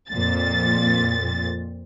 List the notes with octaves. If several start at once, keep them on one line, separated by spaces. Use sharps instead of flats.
F2 A#2 A6